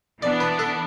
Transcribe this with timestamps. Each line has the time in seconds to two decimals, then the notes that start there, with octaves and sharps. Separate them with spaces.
0.22 E3 B3 D4 D5
0.40 B4
0.59 A4